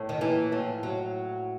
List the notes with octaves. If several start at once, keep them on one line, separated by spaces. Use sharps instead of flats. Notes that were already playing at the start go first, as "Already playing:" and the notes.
Already playing: A2
D#3
A#2 E3
A2 F3
F#3